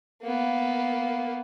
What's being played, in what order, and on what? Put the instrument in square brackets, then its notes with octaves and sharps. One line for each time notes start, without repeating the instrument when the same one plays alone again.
[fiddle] A#3 B3